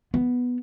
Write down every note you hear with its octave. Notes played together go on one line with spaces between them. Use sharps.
B3